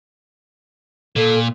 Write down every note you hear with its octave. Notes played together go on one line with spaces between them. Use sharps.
A#2 A4